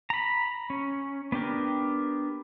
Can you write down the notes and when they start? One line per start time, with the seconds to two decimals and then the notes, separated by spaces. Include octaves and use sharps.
0.10 A#5 B5
0.70 C#4
1.32 B3 D4 G4 A#4